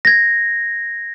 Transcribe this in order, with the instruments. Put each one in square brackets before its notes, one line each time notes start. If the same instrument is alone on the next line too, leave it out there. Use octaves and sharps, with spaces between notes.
[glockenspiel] G#6 A#6